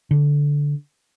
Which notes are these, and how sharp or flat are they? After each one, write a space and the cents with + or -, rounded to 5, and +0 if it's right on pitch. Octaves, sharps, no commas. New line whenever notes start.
D3 -10